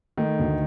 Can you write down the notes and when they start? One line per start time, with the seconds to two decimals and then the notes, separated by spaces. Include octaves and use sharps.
0.18 D#3 A3
0.39 D2